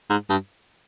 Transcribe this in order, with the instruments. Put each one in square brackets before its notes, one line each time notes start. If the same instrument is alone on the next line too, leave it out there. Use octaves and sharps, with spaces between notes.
[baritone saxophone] G#2
G2